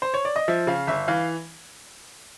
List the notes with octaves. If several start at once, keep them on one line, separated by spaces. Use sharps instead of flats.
C5
C#5
D5
D#5
F3 E5
C#3 F5
G1 E5
E3 F5